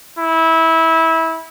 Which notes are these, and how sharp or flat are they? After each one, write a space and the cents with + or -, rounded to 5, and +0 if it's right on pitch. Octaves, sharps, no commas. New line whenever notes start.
E4 -20